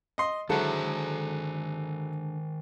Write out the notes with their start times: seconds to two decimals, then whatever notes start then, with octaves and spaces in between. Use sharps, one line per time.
0.18 D#5 C6
0.49 D3 D#3 F#3 G#3 E4 A4 C5 F#5